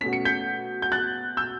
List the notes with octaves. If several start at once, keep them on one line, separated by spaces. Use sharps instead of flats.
B2 A3 C#4 B6
C#7
G6 B6
G6
F#6 A6
E6 G6